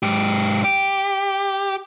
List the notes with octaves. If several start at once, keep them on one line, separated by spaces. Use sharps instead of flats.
G#2 G4
G4